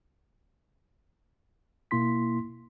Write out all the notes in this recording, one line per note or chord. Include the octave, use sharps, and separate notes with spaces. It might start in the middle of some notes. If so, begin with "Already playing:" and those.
B2 A#3 E4 C6 B6